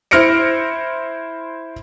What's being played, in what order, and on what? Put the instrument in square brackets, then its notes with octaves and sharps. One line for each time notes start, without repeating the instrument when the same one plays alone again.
[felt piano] E4 C5 F6 A#6 C#7 D7